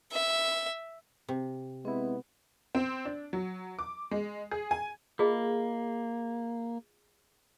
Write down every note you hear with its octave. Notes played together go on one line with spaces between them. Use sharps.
E5
C3
G#3 B3 C4 E4
C4
D4
F#3
D6
G#3
G#4
G#5
A#3 F4 G#4 D#5